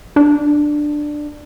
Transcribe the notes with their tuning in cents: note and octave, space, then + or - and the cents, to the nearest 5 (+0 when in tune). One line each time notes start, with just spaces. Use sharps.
D4 +10